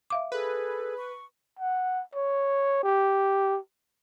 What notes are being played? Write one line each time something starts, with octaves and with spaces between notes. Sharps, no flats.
E5 F5 D6
G#4 A4 B4
C#6
F#5
C#5
G4